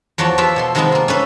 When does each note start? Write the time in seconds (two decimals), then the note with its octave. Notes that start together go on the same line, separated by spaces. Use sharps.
0.18 E2 F3 F#4 C#5 D5 A5
0.38 F3 F4 G4 B4 E5
0.56 B2 A4 C6
0.75 C3 D#3 F3 G#3 B3 C4
0.92 A#3 F4
1.08 C#4 A4 B4 C5